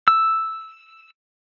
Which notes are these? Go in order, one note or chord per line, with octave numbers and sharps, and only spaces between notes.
E6